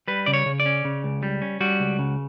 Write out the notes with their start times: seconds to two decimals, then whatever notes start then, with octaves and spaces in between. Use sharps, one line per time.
0.08 G3 B4
0.26 C#3 D5
0.33 C#5
0.46 C#3
0.60 D5
0.66 C#4
0.85 C#3
1.04 C#2
1.23 G3
1.42 C#4
1.61 G3 F#4
1.80 C#2
1.99 C#3